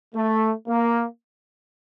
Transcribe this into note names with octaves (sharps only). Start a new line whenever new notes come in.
A3
A#3